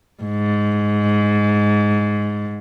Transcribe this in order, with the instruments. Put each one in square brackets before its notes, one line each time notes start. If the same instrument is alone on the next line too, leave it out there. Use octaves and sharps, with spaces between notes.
[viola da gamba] G#2